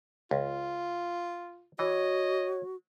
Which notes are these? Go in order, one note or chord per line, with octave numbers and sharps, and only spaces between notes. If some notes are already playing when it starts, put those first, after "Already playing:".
C#2 F4
E3 F#4 C#5 D#5